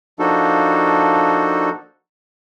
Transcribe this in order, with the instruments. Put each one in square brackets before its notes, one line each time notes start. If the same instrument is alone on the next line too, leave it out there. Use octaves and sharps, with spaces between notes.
[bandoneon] F3 A#3 D4 D#4 F#4 A4